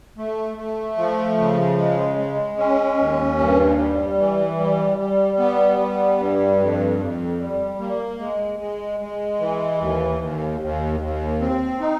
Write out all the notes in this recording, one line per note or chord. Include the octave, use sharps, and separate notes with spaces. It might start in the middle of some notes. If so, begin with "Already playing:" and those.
A3
A3
F3
C#3
G#3
G#3
C#4
D#2
G2
G3
E3
G3
G3
B3
G3
G2
F2
F2
G3
A#3
G#3
G#3
G#3
E3
D#2
D#2
D#2
D#2
C4
D#4